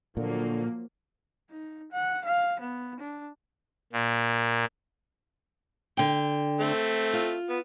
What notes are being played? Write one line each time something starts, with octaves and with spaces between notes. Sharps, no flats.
A#2 D3 F3 F#3 A#3
D#4
F#5
F5
B3
D4
A#2
D3 G5
A3 C4
F4
B3